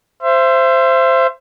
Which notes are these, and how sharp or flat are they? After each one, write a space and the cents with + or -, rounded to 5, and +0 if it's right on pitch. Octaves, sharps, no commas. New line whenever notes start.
C5 +0 E5 +35